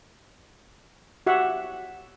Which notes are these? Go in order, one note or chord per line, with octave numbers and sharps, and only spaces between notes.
F#4 G4 E5 F#5